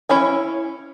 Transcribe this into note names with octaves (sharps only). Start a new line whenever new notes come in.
C#4 E4 C#5 G#5